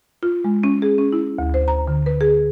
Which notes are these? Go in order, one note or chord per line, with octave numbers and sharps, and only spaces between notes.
F4
G#3
C#4
G#4
C#4
E4
D2
C5
A#5
D3
B4
G#4